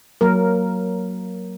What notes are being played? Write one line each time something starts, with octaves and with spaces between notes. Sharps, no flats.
F#3 A#3 A#4